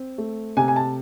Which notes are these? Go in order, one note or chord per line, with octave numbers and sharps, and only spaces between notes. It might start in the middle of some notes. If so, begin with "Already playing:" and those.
Already playing: C4
A3
C3 G#5
G#5
A5